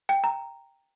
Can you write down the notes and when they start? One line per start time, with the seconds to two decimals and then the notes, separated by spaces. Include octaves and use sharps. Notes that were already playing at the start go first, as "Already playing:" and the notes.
0.09 G5
0.24 A#5